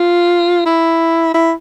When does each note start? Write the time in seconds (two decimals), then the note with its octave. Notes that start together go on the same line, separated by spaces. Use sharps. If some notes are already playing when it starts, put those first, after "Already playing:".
Already playing: F4
0.65 E4
1.34 E4